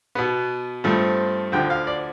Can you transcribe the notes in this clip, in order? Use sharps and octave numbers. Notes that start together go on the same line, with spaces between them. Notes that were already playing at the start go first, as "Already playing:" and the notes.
B2 B3
G2 F3 A3 C4
D2 D3 F3 G5
F5
D5